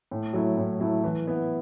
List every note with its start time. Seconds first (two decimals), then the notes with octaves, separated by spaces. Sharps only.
0.11 A2
0.33 F#3 A3 E4
0.57 A2
0.80 F#3 A3 E4
1.04 E3
1.27 B3 E4